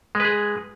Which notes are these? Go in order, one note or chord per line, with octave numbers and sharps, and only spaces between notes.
G#3 G#4 B4